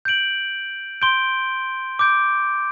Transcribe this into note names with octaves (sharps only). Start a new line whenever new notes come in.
G6 D7 F#7
C6 G6 D7 G7
D6 G6 D7